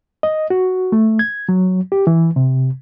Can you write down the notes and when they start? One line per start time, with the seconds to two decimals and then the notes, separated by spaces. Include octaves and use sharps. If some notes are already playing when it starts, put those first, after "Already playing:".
0.23 D#5
0.50 F#4
0.92 A3
1.19 G#6
1.49 F#3
1.92 G4
2.07 E3
2.36 C3